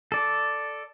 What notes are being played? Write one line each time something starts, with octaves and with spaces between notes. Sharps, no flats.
A4 D5